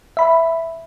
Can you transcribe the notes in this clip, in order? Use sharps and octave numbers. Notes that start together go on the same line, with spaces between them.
E5 B5